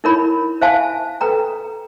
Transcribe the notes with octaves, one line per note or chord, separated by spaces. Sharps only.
D#4 E4 A#4 C#5 B5
C5 E5 F5 G#5 A5
A4 B4 G5 A#5